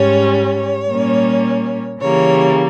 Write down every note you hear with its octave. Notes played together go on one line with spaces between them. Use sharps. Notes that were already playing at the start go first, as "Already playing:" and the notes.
Already playing: G#2 G3 C#4 C#5
C#5
A#2 G3 A#3 C#4
C#3 E3 G3 A#3 C#5